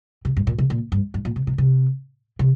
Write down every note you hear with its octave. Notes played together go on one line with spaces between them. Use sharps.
C3
G2
A#2
C3
A#2
G2
G2
A#2
C3
C3
C3
C3